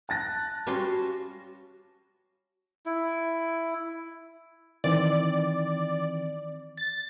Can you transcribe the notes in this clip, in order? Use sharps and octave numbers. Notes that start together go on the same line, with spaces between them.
A5 F#6 A6 A#6
G3 C#4 F4 F#4
E4
D#3 E3 C4 D5
A6